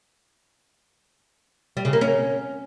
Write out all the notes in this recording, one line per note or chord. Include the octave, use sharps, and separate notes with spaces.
G3
C#3
A#3
C#4